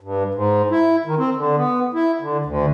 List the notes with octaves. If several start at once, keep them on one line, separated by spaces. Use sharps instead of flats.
G2
G#2
E4
D#3
C4
D3
B3
E4
D3
D2